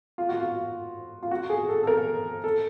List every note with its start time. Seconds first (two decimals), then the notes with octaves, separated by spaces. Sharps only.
0.18 F4
0.29 F#4
0.40 F4
1.23 F4
1.31 F#4
1.50 G#4
1.69 A4
1.83 A4
1.87 A#4
2.44 A4